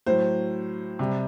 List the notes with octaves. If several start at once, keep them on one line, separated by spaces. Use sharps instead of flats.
A2 F#3 C5
C3 G3